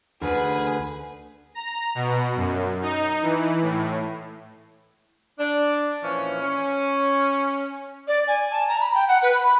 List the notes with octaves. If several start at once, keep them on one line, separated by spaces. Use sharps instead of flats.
D2 G#4 B4
A#5
B2
F#2
D#4
E3
A2
D4
A#2 E3 F3 C#4
C#4
D5
G#5
A5
A#5
B5
G5
F#5
B4
B5